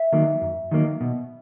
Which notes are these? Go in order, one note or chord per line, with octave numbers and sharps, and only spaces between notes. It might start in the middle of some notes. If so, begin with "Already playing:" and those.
Already playing: E5
D#3 F#3 A#3
F#2
D#3 F#3 A#3
B2